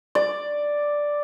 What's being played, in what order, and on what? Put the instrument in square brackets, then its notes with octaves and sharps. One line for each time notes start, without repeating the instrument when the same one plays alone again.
[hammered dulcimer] D5